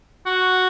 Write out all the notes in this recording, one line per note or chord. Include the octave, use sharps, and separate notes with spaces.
F#4